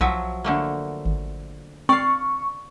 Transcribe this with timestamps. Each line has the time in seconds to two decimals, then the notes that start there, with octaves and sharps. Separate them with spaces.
0.01 B1 F3 F#3 E5
0.44 D3 A3 A#3
1.05 G#1
1.89 C4 D5 F5 C#6